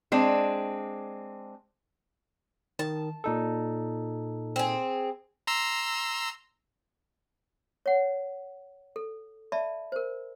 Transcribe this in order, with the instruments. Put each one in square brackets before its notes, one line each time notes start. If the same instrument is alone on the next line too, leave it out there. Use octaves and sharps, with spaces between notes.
[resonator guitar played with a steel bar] G#3 C4 D4
[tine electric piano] D#3 [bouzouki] A5
[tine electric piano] A#2 D#4 A4
[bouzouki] C4 G#4
[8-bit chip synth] A#5 C6 E6
[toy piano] C#5 F#5
A4
D5 E5 A5 B5
A#4 C5